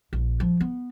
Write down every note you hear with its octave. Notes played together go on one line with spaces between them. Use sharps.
A#1
F3
B3